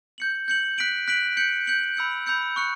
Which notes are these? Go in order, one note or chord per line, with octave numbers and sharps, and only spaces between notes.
G6 C#7 F#7
G6 C#7 F#7
F#6 B6 D7 F#7
F#6 B6 D7 F#7
G6 C#7 F#7
G6 C#7 F#7
B5 E6 G6 C#7
B5 E6 G6 C#7
C#6 F#6 C#7